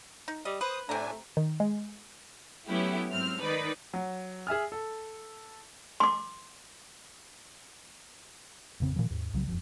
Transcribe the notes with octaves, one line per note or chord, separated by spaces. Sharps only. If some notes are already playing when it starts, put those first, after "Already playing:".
D#4
G3 D#5
B4 C5 D#6
A2 C3 A3 D4 G#5 A#5
D#3
G#3
F#3 A3 B3 C#4 E4 G4
G#2 F#3 C4 F6
D#3 D#4 B4 D5
F#3
G#4 E5 G#5 F6
A4
C6 D6
A1 F2 C#3 C4
A#2 D#3 F3
D#2 G#2
C2 C#3 E3 F#3
E1 F#2 F3